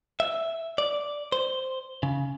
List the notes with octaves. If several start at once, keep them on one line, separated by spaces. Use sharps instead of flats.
E5
D5
C5
C#3